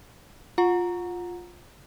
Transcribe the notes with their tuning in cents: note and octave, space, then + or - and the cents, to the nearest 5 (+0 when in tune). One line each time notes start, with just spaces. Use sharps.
F4 +10 F#5 -20 A#5 +0